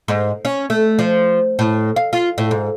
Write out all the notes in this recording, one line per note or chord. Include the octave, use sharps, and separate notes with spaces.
G#2
C#4
A3
F3
A2
F5
F4
A2
G#2